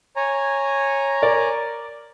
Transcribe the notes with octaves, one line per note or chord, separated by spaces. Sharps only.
C#5 G#5 A#5
A#4 D5